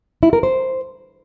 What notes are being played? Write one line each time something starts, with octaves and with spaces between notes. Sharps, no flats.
E4
A#4
C5